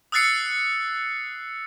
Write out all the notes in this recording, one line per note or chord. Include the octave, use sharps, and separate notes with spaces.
D#6 E6 F#6 A6 C7 C#7